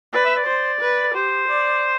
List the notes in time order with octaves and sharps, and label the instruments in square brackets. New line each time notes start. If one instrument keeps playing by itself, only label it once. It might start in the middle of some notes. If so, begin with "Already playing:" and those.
[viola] B4 [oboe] D5
[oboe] E5
D5
[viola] C5
B4
[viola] G4 [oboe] C5
[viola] D5